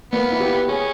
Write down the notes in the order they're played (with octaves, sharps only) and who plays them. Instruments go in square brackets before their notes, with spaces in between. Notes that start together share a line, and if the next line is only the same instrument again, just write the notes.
[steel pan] A#3 [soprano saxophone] B3
[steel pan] E4
G4
[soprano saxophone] C#4 [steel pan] G#4